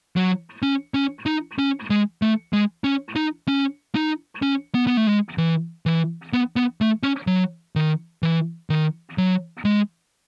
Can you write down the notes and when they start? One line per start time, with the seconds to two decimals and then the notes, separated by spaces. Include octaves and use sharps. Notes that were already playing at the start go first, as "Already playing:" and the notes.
0.16 F#3
0.62 C#4
0.94 C#4
1.26 D#4
1.59 C#4
1.90 G#3
2.22 A3
2.53 G#3
2.84 C#4
3.16 D#4
3.48 C#4
3.95 D#4
4.42 C#4
4.75 B3
4.87 B3
4.97 A3
5.07 G#3
5.38 E3
5.86 E3
6.33 B3
6.56 B3
6.81 A3
7.03 C#4
7.27 F#3
7.76 D#3
8.23 E3
8.70 D#3
9.18 F#3
9.65 G#3